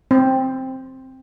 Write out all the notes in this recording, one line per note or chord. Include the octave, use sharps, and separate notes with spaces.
C4